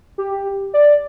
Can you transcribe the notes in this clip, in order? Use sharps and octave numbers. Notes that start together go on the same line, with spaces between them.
G4
D5